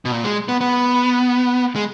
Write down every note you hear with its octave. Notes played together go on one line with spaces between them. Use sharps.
B2
A#2
G#3
B3
B3
G#3